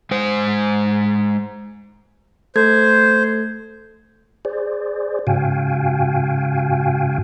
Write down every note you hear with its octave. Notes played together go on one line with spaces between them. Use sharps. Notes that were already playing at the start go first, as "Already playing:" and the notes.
G#3 C5
A3 A4 C5 G#6
G#4 C5 D5
G#2 C#3 F#4 F5 G5 G#5